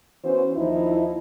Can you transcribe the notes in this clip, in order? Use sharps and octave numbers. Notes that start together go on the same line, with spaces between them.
E3 B3 C#4 F#4 C5
D#2 F3 D#4 E4